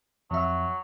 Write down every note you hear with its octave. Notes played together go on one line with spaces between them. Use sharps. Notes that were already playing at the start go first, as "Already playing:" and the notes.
F2 F#3 E5